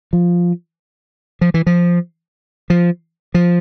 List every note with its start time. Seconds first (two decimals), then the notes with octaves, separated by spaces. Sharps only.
0.13 F3
1.41 F3
1.54 E3
1.67 F3
2.70 F3
3.34 F3